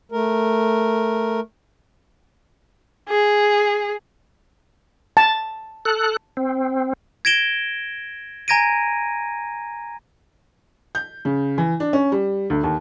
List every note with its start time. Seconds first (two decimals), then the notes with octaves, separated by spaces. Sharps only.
0.12 A3 A#4
3.09 G#4
5.17 A5
5.85 A4 F#6
6.37 C4
7.25 G#6 A#6 D7 E7 G7
8.48 G#5 A#5 G#6 A#6 D7 D#7
10.95 G6
11.25 C#3
11.58 E3
11.80 D4
11.93 C#4
12.12 G3
12.50 D2
12.63 D#2